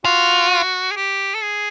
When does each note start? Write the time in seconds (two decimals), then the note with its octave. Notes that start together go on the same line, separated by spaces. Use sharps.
0.05 F4 F#4
0.92 G#4
0.96 G4
1.35 A4
1.42 G#4